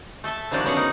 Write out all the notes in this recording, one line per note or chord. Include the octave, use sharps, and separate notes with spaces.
A3 A4 E5 A5
C3 D#3 F3 G3 D4 F#4
D3 B3 C#4 G#4 F#5
D#4 A#4